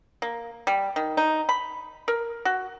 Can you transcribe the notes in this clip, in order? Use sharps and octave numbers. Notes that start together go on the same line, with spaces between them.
A#3
G3
D#3
D#4
B5
A#4
F#4